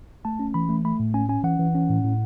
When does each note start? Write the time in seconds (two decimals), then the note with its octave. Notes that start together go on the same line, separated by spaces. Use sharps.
0.25 A3 A5
0.39 C#4
0.54 E3 B5
0.69 A3
0.85 A3 B5
1.00 A2
1.14 C#4 G#5
1.29 C#4 G#5
1.44 E3 F#5
1.59 E3
1.75 C#4
1.90 A2
2.04 A2